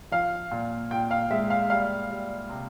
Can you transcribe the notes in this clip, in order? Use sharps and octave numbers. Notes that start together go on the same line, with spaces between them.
F3 F5
A#2
A#2 G5
F5
G#3 E5
F5
G3 F5
G3
C3